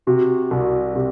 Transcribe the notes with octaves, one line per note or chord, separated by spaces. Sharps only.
C3 F#4
C2
C3 G4